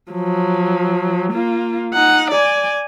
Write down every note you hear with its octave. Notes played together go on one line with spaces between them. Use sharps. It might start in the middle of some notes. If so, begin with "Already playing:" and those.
F3 F#3
A#3 F4
D#4 F#5
D5 G#5